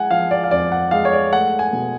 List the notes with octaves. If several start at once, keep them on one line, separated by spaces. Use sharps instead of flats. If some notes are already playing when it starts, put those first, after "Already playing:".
Already playing: G#3 F#5 G#5
F3 F5
D5
F5
F2 D5
F#5
G#3 F5
C#5
D5
A3 F#5
G#5
B2